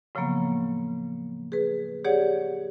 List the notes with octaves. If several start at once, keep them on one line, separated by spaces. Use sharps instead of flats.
A2 C#3 F3 F#3 A#3 B3
G#4 B4
G4 G#4 C#5 D5 F#5